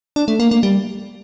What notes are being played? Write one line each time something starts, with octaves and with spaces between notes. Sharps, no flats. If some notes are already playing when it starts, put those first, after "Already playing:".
D4
A3
A#3
A#3
G3